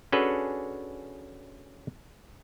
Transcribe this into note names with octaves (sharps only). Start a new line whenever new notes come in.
C#4 D4 F#4 G#4 A4 B4